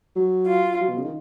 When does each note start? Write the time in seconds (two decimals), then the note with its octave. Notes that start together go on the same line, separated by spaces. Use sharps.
0.16 F#3
0.47 F4
0.80 F#3
0.89 B2
0.97 C#3
1.04 D#3